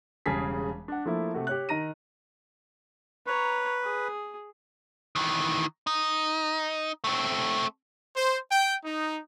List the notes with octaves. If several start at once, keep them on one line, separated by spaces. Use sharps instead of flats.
E1 C#3 G3 G#4 A5 B6
D4 F#5
F3 A3 A#3 E4
C3 A3 F#4
G4 C#5 F#6
D#3 A#5 A#6 D#7
B4 C#5 A#5
G#4
D#3 E3
D#4
A3 C4
C5
G5
D#4